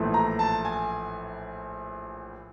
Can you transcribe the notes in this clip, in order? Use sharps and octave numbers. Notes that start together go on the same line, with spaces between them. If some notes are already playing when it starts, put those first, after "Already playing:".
Already playing: A#1 A2 E3 A3
A#5
A5
G#5